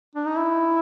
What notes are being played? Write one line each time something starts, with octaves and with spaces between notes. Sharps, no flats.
D4
D#4
E4